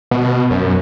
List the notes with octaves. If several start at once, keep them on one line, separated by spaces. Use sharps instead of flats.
B2
F#2